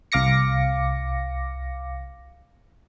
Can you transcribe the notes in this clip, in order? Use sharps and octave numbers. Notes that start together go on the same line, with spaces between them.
C2 F5 D6 A#6 C#7